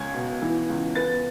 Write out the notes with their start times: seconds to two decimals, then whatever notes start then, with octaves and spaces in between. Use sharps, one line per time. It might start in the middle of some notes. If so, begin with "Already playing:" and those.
Already playing: C#2 C#4 G#6
0.14 B2
0.42 E3
0.69 C#2
0.95 B3 A6